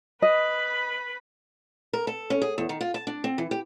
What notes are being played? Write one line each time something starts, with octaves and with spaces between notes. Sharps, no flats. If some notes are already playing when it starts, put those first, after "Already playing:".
B4 D#5 B5
A#4
A4
C#4
G#4
E2
D#3
F4
A5
D4
C4
E3
G4